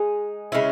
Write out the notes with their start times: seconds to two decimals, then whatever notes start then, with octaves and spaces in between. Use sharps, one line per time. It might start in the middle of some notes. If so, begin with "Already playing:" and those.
Already playing: G#3 D#4 G#4
0.52 C#3 G#3 C#4 E4